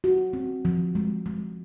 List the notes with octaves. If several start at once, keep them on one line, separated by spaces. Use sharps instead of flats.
F#4
C4
F3
G#3
G#3